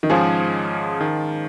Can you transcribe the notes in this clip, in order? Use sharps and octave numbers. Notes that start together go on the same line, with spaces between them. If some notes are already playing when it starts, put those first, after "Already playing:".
D#3
G#2 F3 G#3 C#4 G#4
D#3